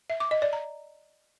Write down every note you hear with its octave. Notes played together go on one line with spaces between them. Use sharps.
E5
D6
D#5
D5
A#5